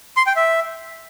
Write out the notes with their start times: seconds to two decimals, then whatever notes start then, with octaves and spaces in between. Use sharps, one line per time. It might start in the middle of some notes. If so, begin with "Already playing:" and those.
0.17 C6
0.26 G5
0.36 E5